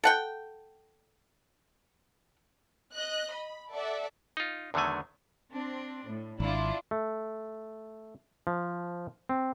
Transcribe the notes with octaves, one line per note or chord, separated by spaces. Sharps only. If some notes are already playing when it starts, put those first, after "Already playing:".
A4 F#5 G5
D#5 F#6
B5
A4 D5 E5 F#5
D#4 F4
E2 D3 D#3 F#3 A3 G#5
C4 D4
A2
G#1 D4 E4 F4
A3
F3
C4